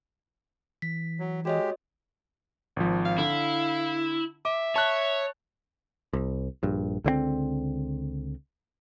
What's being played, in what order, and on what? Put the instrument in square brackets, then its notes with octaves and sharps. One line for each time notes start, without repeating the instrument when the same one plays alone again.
[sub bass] E3 [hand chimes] B6
[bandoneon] F#3
[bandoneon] G#3 G4 [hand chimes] F#4 C#5 D#5
[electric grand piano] G#1 F3
[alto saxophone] F5
[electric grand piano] D3 [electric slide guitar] E4
[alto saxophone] E5 [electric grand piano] D6
[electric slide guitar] C#5 [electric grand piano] A5 F#6
[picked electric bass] C2
A#1 G2
C#2 D3 E3 C4